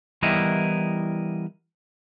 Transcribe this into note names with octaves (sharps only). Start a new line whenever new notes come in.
E3 G3 B3 E4 A#4 D#5